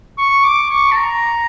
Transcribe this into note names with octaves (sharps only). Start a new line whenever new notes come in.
C#6
D6
C#6
A5
A#5